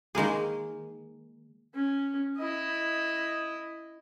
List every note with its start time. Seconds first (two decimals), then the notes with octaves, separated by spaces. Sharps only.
0.15 D#3 G#3 A#3 G#4
1.74 C#4
2.38 E4 D#5